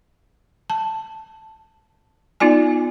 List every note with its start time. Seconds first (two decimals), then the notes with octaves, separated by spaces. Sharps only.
0.70 A5
2.40 B3 D#4 F4 D5 G#5